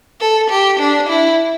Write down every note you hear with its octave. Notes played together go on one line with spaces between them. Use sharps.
A4
G4
D4
E4